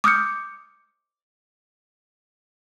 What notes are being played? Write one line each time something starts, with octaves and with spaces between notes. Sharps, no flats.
D6 D#6 F6 G6 C#7